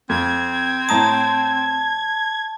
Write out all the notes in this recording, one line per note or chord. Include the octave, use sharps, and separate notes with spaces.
F2 C4 G#6
A2 A5 A#5 D#6